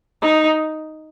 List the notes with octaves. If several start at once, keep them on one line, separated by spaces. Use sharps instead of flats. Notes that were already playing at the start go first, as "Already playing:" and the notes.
D#4